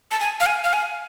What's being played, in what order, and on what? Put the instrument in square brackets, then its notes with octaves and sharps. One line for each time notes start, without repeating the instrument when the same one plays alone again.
[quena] A5
G#5
F5
G#5
F5
G#5